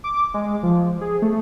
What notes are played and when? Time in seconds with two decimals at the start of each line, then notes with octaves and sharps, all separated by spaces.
0.04 D6
0.34 G#3
0.63 F3
1.01 G#4
1.22 A3